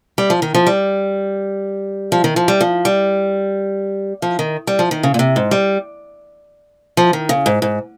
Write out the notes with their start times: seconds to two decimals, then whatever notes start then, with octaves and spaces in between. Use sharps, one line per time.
0.18 G3
0.30 F3
0.42 D#3
0.54 F3
0.67 G3
2.12 F3
2.24 D#3
2.36 F3
2.48 G3
2.61 F3
2.85 G3
4.22 F3
4.39 D#3
4.67 G3
4.79 F3
4.91 D#3
5.03 C#3
5.14 A#2
5.19 C3
5.36 G#2
5.51 G3
6.97 F3
7.13 D#3
7.29 C#3
7.46 G#2
7.62 G#2